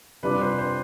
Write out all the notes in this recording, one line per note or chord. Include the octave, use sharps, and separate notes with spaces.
C3 G3 D4 F4 B4
C5
C5